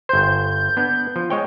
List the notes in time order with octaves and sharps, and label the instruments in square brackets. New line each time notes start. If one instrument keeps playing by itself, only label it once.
[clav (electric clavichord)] G1 C5 [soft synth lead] G6
[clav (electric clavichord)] B3 D4
F3
G#3 C#5 G5